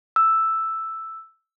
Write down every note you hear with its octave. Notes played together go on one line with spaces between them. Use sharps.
E6